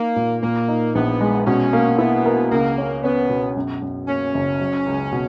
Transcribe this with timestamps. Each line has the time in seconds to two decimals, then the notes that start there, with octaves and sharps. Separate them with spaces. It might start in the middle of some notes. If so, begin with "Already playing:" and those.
Already playing: A#3 D#4
0.16 A#2
0.42 A#2 A#3
0.68 D#4
0.95 A#1 B3
1.21 G#3
1.47 B2 C#4
1.73 A#3
1.99 B3 E4
2.26 A#4
2.51 C#2 A#3
2.78 C#4
3.03 B3 C#4
3.29 B2
3.56 F#2
3.82 F#2
4.08 A#3 C#4
4.34 F#1
4.60 F#3
4.86 C#2
5.12 B2